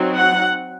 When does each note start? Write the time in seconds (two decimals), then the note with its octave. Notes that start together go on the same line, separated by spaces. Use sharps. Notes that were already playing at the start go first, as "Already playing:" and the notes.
Already playing: F#3 C4 D#4
0.16 F#5